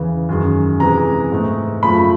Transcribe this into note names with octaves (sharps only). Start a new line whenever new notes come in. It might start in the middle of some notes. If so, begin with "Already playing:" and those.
Already playing: E2 C#3 E3
F#2 D#3 G#3
C3 E3 G#3 A#5
G#2 E3 A3
F#2 C#3 F3 A3 B5